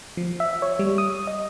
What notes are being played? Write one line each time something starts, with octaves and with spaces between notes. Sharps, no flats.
F3
E5
C#5
G3
D#6
D#5